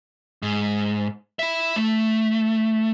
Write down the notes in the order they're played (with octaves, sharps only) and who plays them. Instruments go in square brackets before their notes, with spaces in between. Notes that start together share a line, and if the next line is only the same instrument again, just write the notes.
[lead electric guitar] G#2
E4 E5
A3